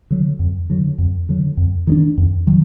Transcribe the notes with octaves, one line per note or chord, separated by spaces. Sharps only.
D3 F#3
F2
D3 F#3
F2
D3 F#3
F2
D#3 F#3 D4
F2
D#3 F#3